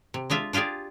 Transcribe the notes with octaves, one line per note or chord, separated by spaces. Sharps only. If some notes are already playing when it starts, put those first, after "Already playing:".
C3
G#3 D4 F4 E5
D4 F4 G4 G#4 D5